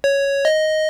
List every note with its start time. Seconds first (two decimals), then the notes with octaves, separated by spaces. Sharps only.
0.04 C#5
0.45 D#5